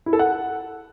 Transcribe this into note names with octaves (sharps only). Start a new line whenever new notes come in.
E4
A4
F#5